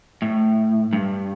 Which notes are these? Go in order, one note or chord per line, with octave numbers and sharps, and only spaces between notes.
A2
G2